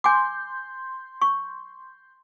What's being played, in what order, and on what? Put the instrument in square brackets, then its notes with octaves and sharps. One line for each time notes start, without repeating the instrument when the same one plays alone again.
[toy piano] G#5 D6 [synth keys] C6 G6
[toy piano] C#6